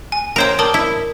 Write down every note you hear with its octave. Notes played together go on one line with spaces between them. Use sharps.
G#5
A#4 C5 C#5 G5 A#5
A#4 D5 A5 D#6
E4